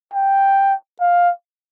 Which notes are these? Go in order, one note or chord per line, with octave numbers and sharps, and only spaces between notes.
G5
F5